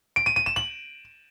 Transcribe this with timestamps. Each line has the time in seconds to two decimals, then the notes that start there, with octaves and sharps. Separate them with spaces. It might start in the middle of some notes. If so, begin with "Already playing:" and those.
0.16 D7
0.26 D#7
0.36 D#7
0.46 E7
0.56 F#7